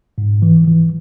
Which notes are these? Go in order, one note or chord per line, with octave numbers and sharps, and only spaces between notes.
G#2
E3
E3